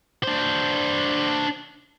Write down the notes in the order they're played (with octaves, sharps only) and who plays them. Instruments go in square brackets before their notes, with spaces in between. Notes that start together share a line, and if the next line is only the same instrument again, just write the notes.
[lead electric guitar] D4 C5